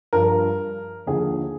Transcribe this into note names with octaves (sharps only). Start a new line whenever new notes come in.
G2 F3 A#4
D#2 D3 F3 G#4